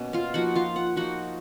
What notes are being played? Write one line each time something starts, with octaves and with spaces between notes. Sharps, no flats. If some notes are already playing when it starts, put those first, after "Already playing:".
Already playing: B2 A#3 C#4
F4 F5
F3 A#3 D#4 F#4 F#5
F4 F5
F#5
F3 A#3 D#4 F#4 F#5